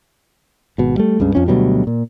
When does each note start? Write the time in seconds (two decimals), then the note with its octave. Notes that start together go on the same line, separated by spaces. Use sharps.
0.78 G#1 B2
0.97 G3 A3
1.20 C#2 G2 C#3
1.35 F2 F3 C#4
1.48 D2 B2 F#3 G3
1.87 A#2